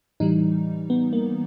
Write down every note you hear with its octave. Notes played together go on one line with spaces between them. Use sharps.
A2 E3 G3 D#4
B3
A#3